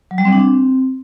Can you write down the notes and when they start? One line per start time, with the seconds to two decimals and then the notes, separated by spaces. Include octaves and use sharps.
0.11 F#3
0.18 G3
0.25 C4
0.32 D4
0.40 C4